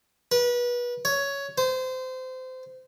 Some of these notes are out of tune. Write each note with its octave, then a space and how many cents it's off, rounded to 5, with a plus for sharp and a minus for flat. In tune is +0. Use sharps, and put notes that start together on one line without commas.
B4 -30
C#5 +10
C5 -25